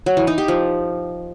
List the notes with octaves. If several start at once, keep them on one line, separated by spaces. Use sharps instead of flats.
F#3
E3
D#4
G4
F3